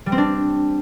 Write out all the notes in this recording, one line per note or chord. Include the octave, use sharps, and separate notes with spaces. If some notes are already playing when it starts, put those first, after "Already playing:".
G3
C4
D4